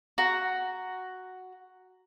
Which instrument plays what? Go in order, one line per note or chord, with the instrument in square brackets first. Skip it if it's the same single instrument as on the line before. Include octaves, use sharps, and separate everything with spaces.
[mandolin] F#4 A#5